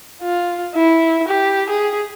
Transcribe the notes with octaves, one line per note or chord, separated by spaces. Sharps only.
F4
E4
G4
G#4